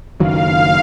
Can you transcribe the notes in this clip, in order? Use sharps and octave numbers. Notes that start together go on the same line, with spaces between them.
F#1 D#3 F#3 F5